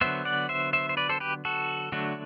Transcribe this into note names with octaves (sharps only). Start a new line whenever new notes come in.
D3 F#3 B3 C5 E5
D5 F#5
C5 E5
C5 E5
C5
B4 D5
A4 C5
G4 B4
F#4 A4
D3 F#3 A3 D4 F#4